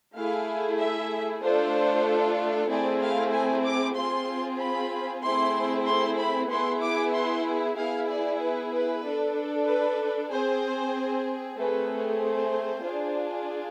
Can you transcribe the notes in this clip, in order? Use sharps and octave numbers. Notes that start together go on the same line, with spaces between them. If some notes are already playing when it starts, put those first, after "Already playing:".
A3 E4 G#4 F5
E5
A3 D4 F4 A4 C5
A3 C4 E4 G#4 D5
F5
G#5
D6
C4 F4 G#4 C6
B5
A3 C4 E4 G#4 C6
C6
B5
B3 E4 G#4 C6
D6
C6
B3 E4 G#4 F5
D5
B4
B4
D4 A4
B4
C4 G#4 C5
A3 C4 G#4 B4
C5
D4 F4 G#4